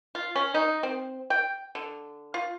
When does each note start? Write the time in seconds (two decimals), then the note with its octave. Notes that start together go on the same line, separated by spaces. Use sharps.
0.15 F4
0.36 C#4
0.54 D#4
0.83 C4
1.30 G5
1.75 D3
2.34 F4